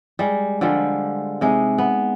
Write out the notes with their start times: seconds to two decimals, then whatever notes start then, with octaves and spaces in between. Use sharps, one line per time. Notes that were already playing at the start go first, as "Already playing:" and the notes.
0.19 G3 G#3
0.61 D3 F3 G3 G#3
1.41 C3 G#3 D#4
1.78 B3